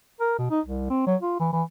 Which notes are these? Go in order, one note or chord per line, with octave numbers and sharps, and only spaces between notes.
A#4
B2
D#4
C2
C4
F#3
F4
E3
E3